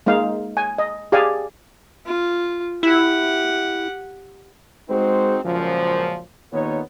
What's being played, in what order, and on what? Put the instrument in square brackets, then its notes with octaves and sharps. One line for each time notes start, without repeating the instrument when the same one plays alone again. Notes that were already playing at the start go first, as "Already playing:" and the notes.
[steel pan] G#3 A#3 D#4 F5
G#5
D#5
G4 G#4 D5 F5 G#5
[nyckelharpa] F4
[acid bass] E4 [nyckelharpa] G4 F#5
[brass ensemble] G#3 C4 D#4 F#4 G#4 C5
C#2 F#2 A#2 F3
D#2 A#2 B3 D#4 C#5